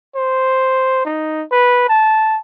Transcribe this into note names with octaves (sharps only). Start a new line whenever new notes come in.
C5
D#4
B4
A5